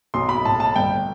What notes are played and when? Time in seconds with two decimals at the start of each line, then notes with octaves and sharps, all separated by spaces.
0.14 B1 C6
0.29 B5
0.45 A2 A5
0.60 A5
0.75 G1 G5